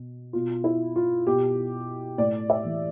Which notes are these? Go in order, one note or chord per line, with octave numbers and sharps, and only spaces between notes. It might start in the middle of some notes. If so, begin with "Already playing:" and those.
Already playing: B2
B2 F4
E4
F4
B2 G4
A2 D5
E5
E3